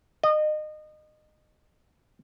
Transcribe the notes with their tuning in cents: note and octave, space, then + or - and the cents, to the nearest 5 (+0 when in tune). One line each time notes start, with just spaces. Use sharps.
D#5 -25